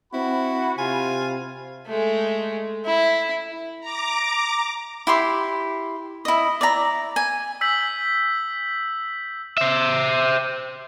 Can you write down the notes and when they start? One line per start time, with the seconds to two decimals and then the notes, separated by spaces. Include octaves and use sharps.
0.13 C4 E4 F#4 B5
0.78 C3 F4 G#5
1.87 G#3 A3
2.85 E4
3.81 A#5 D6
5.07 E4 G4 C6 D6
6.25 E4 D#5
6.61 D5 E5 A#5
7.16 G#5
7.61 E6 G6 B6 F#7
9.58 C5 E5